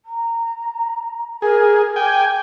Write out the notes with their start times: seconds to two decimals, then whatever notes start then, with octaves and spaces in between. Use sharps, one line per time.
0.05 A#5
1.42 G#4 A#4
1.96 G5 G#5 D6